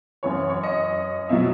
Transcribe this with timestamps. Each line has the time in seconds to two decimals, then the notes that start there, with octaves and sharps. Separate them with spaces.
0.23 F#2 E3 C#5
0.36 C#5
0.49 C#5
0.63 D#5
1.29 B2 F#3 E5